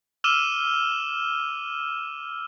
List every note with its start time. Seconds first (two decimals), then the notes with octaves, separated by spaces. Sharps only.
0.24 D6 E6 F6 D#7 E7 G7